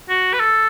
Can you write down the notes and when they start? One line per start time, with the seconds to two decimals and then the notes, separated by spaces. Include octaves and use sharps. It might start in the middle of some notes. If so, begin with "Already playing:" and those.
0.09 F#4
0.33 B4
0.40 A4